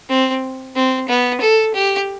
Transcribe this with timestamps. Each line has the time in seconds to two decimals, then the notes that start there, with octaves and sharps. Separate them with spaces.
0.09 C4
0.76 C4
1.09 B3
1.41 A4
1.74 G4